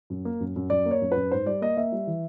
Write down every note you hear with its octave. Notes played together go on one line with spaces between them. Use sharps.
F#2
A#3
F#2
F#2
F#2 D5
A#3
C#5
F#2
F#2 B4
G#2 C5
G3 D5
A#3 D#5
A#3 E5
G3
E3